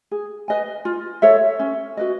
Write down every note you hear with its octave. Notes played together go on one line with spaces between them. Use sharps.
G#4
B4 D#5 G#5
F4
A4 C#5 E5
C#4
F#4 B4 D#5